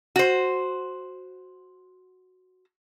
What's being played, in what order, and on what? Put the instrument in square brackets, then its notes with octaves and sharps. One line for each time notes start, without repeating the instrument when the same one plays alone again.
[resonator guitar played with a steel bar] F#4 C5